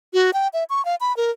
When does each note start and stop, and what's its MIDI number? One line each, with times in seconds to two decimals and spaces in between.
0.13 0.31 66
0.33 0.48 79
0.53 0.64 76
0.69 0.84 85
0.85 0.95 77
1.00 1.15 83
1.17 1.30 70